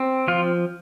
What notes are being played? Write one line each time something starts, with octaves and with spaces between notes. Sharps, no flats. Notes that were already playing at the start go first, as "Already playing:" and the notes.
Already playing: C4
F3 F4